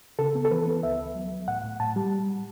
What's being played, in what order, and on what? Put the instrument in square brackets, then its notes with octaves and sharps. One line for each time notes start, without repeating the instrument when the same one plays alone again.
[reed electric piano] C#3 A4
B3
A4
E3 B4
B3
C#2 E5
C#2
F#3
F#3
A2 F#5
A2
A2 A5
G3